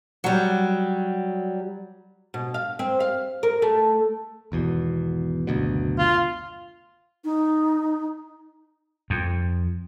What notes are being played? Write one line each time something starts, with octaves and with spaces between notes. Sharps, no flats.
F#3 G3
B2
F5
C4
F5
A#4
A3
G#1 E2 B2
F#1 D2 B2
F4
D#4
F2